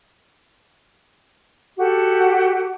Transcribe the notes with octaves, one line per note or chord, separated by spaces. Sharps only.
F#4 G4 A4